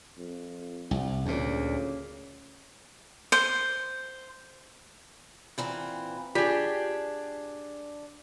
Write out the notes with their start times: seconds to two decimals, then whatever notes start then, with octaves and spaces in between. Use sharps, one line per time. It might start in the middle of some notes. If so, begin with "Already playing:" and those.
0.18 F2
0.91 C2
1.26 D2 A#2 C#3
3.32 C5
5.58 A#2 E3 C4
6.35 D4 F4 G4 G#4